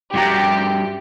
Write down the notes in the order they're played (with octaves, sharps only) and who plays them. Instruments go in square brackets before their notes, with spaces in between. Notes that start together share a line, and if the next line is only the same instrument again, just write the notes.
[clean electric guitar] G2 F#4 A#5 [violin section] G4